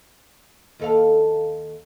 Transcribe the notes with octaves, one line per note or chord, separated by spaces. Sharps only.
D#2 A4 F5